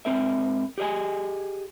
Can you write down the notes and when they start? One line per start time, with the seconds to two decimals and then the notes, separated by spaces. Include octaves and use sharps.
0.05 G#2 F3 C4 A#4 E5
0.78 G4 G#4 D5 D#5 G#5